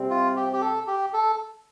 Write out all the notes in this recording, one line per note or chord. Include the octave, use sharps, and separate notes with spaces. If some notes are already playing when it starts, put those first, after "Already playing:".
Already playing: C3 G3 C4
F4
G4
G4
A4
G4
A4